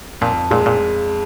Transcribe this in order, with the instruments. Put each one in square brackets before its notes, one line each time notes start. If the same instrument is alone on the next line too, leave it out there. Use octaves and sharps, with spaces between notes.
[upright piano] F2 [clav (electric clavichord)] A#2
[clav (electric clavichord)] A#2 [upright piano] G#3
[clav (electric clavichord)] A#2